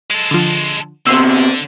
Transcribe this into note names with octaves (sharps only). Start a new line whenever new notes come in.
G#3 A4
D3 F3
B2 D3 C4 C6 E6